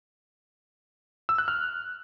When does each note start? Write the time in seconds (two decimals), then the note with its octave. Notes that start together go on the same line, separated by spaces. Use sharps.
1.29 E6
1.38 F#6
1.48 F6